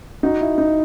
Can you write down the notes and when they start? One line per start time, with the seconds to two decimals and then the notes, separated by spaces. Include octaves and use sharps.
0.23 D#4 F#4
0.41 E4
0.58 D#4